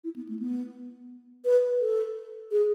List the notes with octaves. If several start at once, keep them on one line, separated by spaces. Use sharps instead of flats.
E4
B3
A3
B3
B4
A4
G#4